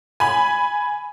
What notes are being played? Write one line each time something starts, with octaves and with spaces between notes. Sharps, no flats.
G#5 B5